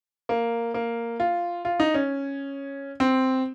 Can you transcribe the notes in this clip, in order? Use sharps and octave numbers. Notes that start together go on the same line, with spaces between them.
A#3
A#3
F4
F4
D#4
C#4
C4